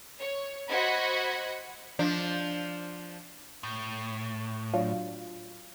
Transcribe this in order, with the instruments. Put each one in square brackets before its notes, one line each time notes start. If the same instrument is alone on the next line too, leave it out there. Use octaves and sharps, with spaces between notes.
[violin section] C#5
F#4 C5 D#5 F#5 B5 G#6
[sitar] F3 D4
[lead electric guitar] A2
[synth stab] F#3 D4 F4